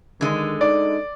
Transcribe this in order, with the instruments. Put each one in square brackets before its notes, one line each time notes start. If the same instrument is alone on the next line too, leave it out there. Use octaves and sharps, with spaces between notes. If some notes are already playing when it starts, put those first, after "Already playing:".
[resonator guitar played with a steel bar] D3 G#3 [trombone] D#3
[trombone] D#4 [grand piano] D5